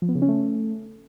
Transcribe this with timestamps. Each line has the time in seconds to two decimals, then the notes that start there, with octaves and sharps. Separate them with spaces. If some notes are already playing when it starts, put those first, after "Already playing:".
0.02 F3
0.09 B3
0.15 C#3
0.22 C#4
0.28 A3